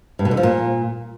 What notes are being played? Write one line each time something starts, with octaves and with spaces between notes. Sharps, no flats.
G2
B2
D3
F3
A#2